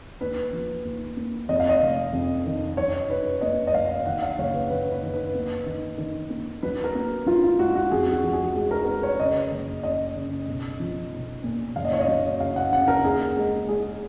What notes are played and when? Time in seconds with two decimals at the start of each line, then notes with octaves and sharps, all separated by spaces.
0.21 D#2 B4
0.53 F3
0.85 D#2
1.17 A#3
1.49 F2 D#5
1.60 F5
1.69 D#5
1.82 F1
2.13 F2
2.46 D#3
2.77 F#2 C#5
3.10 D#4 B4
3.41 A#3 D#5
3.67 D#5
3.73 F#2 F5
4.06 D#3 F#5
4.22 F5
4.38 F#1 C#5
4.54 B4
4.70 F#1 B4
4.92 B4
5.03 D#3
5.14 B4
5.35 A#3
5.66 D#3
5.98 D#3
6.30 A#3
6.63 F#3 B4
6.84 A#4
6.95 A#3
7.26 F#3 F4
7.43 F4
7.59 G#2 F#4
7.75 F#4
7.92 F2 G#4
8.12 F#4
8.24 F3
8.33 G#4
8.55 G#3 G#4
8.71 A#4
8.83 A#4
8.87 G#3 B4
9.03 C#5
9.20 C#3 D#5
9.52 F#1
9.83 C#3 D#5
10.16 C#3
10.48 B1
10.80 F3
11.12 B1
11.44 A#2
11.76 F#1 F5
11.85 D#5
11.93 C#5
12.00 D#5
12.08 F#3
12.40 C#3 F5
12.56 F#5
12.72 C#3 F#5
12.88 A#4
13.04 D#2 G#4
13.37 G#3
13.69 G#3 G#4